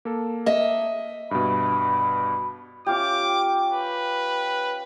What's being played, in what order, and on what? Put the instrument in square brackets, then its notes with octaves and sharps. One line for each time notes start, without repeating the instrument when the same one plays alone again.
[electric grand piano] A#3 A4
[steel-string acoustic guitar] D#5 E5
[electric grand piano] G2 B2 [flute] B5
[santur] C#4 F4 G4 [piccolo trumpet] D6
[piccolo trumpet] B4